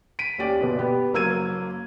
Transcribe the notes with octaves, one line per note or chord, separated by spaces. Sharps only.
B6 D7 D#7
D#2 C#4 G4 D5
G1 B2
B3 G4
F#1 F#3 A#3 E6 G#6 D#7